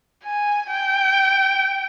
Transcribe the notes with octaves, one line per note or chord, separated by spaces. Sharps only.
G#5
G5